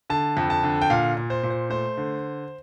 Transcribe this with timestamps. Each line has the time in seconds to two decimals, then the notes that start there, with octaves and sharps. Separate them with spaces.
0.10 D3 A5
0.37 F2
0.50 A5
0.63 D3
0.82 G5
0.90 A#2 F5
1.17 A#2
1.30 C5
1.43 A#2
1.50 C5
1.70 A3 C5
1.97 D3